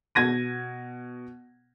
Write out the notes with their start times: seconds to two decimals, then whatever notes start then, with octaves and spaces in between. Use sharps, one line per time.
0.15 B2 G#6 A#6 D#7